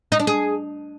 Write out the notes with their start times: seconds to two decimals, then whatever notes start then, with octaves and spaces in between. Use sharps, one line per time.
0.12 D#4
0.19 D4
0.27 G#4